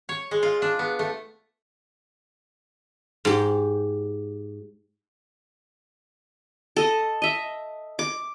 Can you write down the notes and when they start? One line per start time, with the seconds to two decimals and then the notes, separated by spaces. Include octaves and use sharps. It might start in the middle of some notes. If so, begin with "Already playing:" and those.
0.09 C#5
0.31 G#3
0.43 F4
0.62 D4
0.79 B3
0.99 A3
3.25 G#2 G4
6.76 A4 D#5
7.22 D#5 E5
7.99 D6